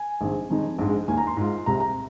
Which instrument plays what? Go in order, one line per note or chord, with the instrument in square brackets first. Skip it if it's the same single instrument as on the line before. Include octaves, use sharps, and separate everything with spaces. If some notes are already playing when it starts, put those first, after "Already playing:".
Already playing: [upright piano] G#5
A#1 G#2 D#3 C4
F1 F2 D#3 G#3 D#4
A#1 G#2 G#3
D#2 D#3 A#3 G#5
A#5
C6
G#2 G#3 F4
C2 C3 G#3 A#5
A#5